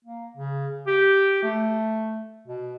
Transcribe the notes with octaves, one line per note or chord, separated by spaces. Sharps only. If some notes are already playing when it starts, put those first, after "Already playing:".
A#3
C#3
G4
A3
B2